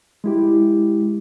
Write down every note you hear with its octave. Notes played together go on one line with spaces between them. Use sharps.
G#3 E4 G4